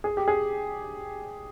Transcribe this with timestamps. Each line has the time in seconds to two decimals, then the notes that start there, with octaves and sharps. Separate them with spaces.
0.04 G#4
0.17 G4
0.28 G#4